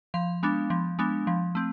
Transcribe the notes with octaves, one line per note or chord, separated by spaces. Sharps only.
F3 F5
G#3 B3 D4
F3
G#3 B3 D4
F3
A3 C4